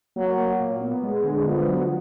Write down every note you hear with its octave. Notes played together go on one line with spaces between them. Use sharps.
F#3 A#3
A#3
A#2
B3
G#3
D3
F3 B3
F#3